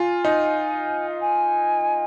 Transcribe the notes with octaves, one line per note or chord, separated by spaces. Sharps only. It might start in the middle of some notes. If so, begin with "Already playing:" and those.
Already playing: F4 G#5
D#4
F5
G#5